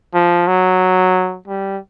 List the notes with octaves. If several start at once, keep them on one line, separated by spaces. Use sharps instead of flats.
F3
F#3
G3